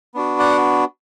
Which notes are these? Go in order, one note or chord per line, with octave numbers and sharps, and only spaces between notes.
B3 D4 F#4
D5 F#5